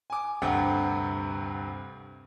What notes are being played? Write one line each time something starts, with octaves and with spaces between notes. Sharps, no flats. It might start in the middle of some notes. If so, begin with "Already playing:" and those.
G#5 D6
D2 G2 C3 F#5 G5